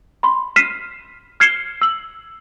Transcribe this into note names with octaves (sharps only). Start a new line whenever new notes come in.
B5 C6
F6 B6 C7 D#7 E7
F6 G#6 C7 C#7 E7 G7
E6 F#7